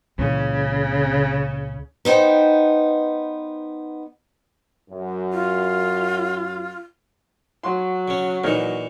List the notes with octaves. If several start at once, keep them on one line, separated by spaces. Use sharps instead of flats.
C#2 A#2 C#3 E3
B3 D#4 C5 G5
F#2
F4
F#3 C6
C#3 C#4
A#2 E3 D#4 A#4 C#5